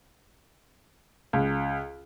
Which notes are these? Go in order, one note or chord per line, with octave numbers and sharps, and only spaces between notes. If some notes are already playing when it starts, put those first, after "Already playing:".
C#2